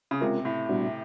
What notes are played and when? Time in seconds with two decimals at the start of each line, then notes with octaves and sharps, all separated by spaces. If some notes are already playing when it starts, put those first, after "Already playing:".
0.11 C#3
0.21 C3 G#3 C#4 F4 A#4
0.45 A2
0.69 A#2 G3 B3 D4 F#4